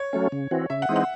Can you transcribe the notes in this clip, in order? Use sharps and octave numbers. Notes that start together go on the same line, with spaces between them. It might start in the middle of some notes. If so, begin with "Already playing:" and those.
Already playing: C#5
F#3 A3 C#4
C#3
E3 C4 F#4
C#3 E5
F#5
E3 G#3 C4 D#4
F#5